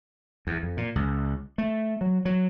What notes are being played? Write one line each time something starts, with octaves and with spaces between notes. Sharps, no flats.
E2
F2
A#2
C#2
A3
F#3
F#3